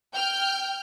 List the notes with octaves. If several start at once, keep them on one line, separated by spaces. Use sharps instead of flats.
G5 F6 G6